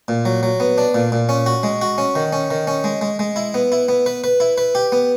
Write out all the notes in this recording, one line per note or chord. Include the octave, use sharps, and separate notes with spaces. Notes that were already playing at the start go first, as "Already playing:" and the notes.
A#2
F#3
F#3
B3
D4
A#2
A#2
C#4
F#4
G#3
F#4
C#4
D#3
C#4
D#3
C#4
G#3
G#3
G#3
E4
B3
E4
B3
B4
B4
E4
B4
G4
B3